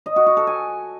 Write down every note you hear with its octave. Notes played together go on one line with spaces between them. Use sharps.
D#5
F#4
F#4
A4
G#5